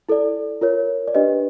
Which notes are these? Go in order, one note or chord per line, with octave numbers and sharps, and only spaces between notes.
E4 A4 D5
F4 A#4 C#5
D5
D4 G4 B4 D#5